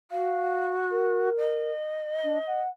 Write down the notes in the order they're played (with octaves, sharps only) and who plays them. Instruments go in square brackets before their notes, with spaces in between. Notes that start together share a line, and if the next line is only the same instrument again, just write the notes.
[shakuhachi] F#4 [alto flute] F5
[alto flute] A#4
[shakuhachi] D#5
[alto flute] D4
F#5